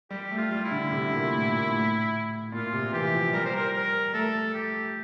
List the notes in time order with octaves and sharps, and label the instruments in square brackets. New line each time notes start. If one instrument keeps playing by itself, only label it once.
[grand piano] G3 [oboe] G4
[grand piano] A3
[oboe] F4
[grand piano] G3
[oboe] E4
[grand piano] D3
C3
A#2
A2
A#2
A2
[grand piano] A#2 [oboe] F4
[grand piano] C3
[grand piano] E3 [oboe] G4
[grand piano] F3
[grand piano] G3 [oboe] A#4
[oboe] C5
A#4
A#4
[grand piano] A3 [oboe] A4
[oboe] G4